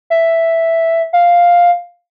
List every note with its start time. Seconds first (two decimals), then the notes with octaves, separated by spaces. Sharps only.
0.10 E5
1.13 F5